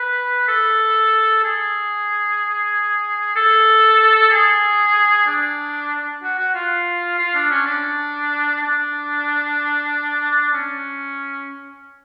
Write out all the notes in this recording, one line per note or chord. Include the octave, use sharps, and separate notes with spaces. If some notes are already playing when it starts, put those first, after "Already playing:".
Already playing: B4
A4
G#4
A4
G#4
D4
F#4
F#4
F4
F4
D4
C#4
D4
D4
C#4